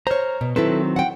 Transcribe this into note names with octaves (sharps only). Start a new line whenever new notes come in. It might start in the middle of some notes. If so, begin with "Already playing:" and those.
C5 C#5 A#5 F6
B2
D#3 F#3 C4 E4 A4 B4
F#5 G5